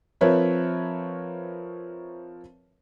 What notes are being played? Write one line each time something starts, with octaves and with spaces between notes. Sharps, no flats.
F3 C4 A#4 B4 C#5 E5